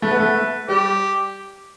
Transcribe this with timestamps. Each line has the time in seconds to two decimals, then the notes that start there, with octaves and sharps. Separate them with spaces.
0.02 A3 B4
0.11 B3
0.20 A3
0.68 G3 G4